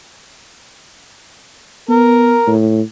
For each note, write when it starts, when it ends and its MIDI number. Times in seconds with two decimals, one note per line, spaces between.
1.89 2.37 59
1.89 2.50 70
2.47 2.82 45